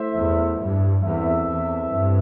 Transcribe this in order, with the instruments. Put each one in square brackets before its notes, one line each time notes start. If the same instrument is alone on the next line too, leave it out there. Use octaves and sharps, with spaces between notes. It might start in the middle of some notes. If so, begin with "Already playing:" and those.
Already playing: [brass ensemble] A3 E4 C5 E5
[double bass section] E2
G2
[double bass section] E2 [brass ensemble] E3 C4 A4 E5
[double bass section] E2
G2